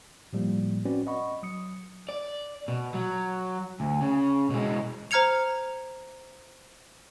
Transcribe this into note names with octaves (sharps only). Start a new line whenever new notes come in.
A2 F3 G3 A#3
C4 C#4 F#4 B4 D5
D#5 F#5 B5 C#6
F#3 D#6 C#7
D5
B2
F#3
D2
C#3
B2 G#3
C5 A#5 F6 G#6 C#7 F7